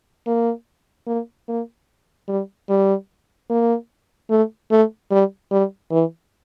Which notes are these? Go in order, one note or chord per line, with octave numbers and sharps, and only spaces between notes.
A#3
A#3
A#3
G3
G3
A#3
A3
A3
G3
G3
E3